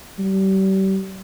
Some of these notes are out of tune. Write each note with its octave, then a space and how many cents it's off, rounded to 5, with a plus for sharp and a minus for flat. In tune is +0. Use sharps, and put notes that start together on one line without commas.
G3 -35